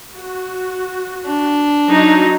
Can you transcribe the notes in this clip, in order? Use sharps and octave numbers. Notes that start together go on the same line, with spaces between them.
F#4
D4
F#3 D#4